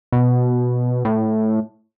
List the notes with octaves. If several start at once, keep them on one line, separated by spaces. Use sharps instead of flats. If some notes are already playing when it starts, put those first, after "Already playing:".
B2
A2